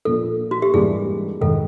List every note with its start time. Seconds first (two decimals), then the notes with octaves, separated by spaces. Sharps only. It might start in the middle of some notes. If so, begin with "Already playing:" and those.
0.05 A#2 F3 A#3 D4 A4
0.51 F#4
0.62 G4
0.73 G#2 E3 G3 A#3 D4 G#4
1.41 G#2 D#3 A4